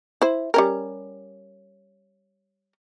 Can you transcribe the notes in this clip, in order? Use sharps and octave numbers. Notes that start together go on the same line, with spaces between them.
E4 C5
G3 C#4 A#4